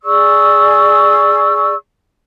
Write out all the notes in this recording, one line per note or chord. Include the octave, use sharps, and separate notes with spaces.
G#4 D5 C#6 E6